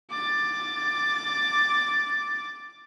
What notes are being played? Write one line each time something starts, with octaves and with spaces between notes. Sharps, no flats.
D6 A6